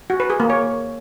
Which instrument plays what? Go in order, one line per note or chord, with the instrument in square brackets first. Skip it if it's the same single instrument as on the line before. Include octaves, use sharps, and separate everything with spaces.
[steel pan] F#4
B4
G#4
A#3
C#5